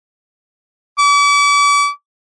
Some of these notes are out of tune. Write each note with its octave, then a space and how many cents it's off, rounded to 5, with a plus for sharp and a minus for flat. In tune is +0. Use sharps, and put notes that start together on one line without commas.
D6 -40